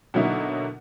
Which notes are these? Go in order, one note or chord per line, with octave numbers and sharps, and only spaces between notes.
B2 D3 F#3 A#3 D#4 E4